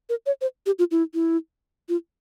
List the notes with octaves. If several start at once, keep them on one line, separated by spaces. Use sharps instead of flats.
A#4
C#5
C5
G4
F4
E4
E4
F4